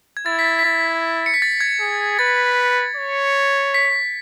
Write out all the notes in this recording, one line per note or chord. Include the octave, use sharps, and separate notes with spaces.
G#6
E4 A6
B6
A6
B6
E4 A6
C#7
B6
A6
G#6
G#4
B4 A6
C#5
B6